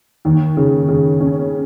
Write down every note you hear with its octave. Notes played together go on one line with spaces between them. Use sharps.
D#2
C#3
C#3
C#4